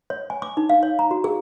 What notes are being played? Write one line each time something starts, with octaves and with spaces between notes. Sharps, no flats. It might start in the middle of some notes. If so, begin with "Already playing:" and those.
C#5
G#5
D6
D#4
F5
C#5
A#5
F#4
G#4